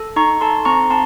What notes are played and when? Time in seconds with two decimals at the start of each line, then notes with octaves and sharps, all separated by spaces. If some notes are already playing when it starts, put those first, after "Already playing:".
Already playing: A4
0.16 D#4 A#5 C#6
0.41 A4 A5 C6
0.65 C4 A#5 C#6
0.90 C4 A5 C6